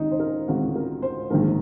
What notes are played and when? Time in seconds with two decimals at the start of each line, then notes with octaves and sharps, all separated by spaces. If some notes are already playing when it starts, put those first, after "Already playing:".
Already playing: C#2 C3 D#3 C#4 D#4
0.11 C5
0.20 A#4
0.48 C#2 C3 D#3 F#4
0.76 A#4
1.02 C5
1.30 A#1 G#2 D#3 A#4